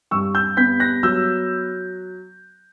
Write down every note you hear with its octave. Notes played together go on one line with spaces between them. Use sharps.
G2 C#6 E6
E6 G6
B3 G6 B6
F#6 A#6
F#3 E6 G6